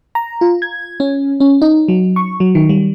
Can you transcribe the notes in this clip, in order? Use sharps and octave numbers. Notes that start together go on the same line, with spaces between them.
A#5
F4
G#6
C#4
C#4
D#4
F#3
C#6
F#3
D#3
G3